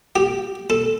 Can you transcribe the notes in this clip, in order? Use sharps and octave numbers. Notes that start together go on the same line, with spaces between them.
G4
A4